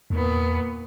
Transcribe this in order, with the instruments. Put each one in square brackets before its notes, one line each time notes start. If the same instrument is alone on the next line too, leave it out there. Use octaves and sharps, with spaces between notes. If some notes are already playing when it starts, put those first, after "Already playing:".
[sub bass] E2 [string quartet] A#2 D#3 B3